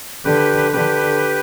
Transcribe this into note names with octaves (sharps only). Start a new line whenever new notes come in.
D3 G4 B4
D3 G4 B4